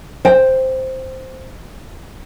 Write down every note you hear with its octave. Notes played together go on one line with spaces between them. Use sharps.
C5 G5